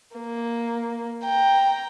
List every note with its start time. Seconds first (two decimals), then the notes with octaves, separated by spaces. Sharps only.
0.17 A#3
1.24 G5 A#5